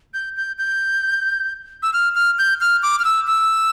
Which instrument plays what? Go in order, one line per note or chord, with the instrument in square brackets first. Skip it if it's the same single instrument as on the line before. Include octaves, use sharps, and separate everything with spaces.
[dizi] G6
G6
G6
E6
F6
F6
G6
F6
D6
F6
E6
E6